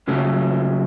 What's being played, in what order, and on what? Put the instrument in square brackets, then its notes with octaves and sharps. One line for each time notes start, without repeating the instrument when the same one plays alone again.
[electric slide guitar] F#2 C#3 F#3 A3